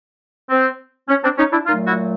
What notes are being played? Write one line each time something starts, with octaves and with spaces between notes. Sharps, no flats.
C4
C#4
C4 D4
C#4 D#4
D4 E4
A#2 F#3 A3 D#4 F4
E4 F#4